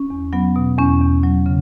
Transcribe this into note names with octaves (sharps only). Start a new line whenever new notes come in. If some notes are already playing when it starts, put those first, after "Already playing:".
Already playing: C#4
E2
F#3 B3
B2
E2 C#4
E2
F#3
C#3